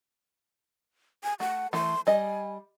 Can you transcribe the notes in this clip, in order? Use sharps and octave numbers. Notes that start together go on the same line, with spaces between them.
G#5
A3 F#5
E3 A3 C6
G3 D#5 G#5